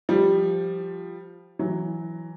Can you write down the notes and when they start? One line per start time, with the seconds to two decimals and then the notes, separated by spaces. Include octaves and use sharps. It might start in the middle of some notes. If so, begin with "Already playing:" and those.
0.09 F3 G3
1.59 E3 F#3